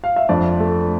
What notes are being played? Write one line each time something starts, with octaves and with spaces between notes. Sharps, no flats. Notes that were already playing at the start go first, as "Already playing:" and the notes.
F5
E5
F2 D4 D5
A3